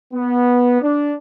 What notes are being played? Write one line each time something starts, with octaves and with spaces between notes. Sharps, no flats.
B3
D4